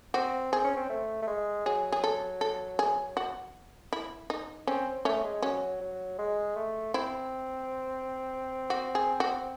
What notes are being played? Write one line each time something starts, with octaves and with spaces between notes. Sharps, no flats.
C4 F#4
C4 G#4
C#4
C4
A3
A3
G#3
F#3 G#4
G#4
A4
A4
G#4
F#4
E4
D#4
C4 C#4
A3 C#4
G#3
F#3 C#4
F#3
G#3
A3
C4 E4
F#4
G#4
F#4